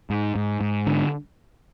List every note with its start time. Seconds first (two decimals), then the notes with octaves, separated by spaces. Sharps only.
0.10 G#2
0.36 G#2
0.61 G#2
0.87 D3